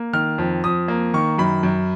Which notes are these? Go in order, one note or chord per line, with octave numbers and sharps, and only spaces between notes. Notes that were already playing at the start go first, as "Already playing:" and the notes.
Already playing: A#3
D#3 F6
F2
F2 D#6
A#3
D#3 C#6
F#2 B5
F#2